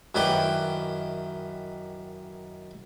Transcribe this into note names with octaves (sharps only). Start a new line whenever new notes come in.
F#2 D#3 E4 B4 D5 G5